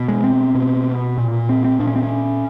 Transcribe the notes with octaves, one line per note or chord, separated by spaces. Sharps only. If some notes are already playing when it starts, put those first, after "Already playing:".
Already playing: B2
G#3
C4
B2
A#2
C4
C4
A#2 D4
C#4
C4
C#4